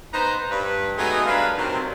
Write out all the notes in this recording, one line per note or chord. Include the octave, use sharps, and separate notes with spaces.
B3 D#4 B4 C5 A#5
G2 B4
F#3 G#3 A3 B3 D#4 G#4
G2 D4 A#4 B4 F5
C3 D#3 F#3 G3 C4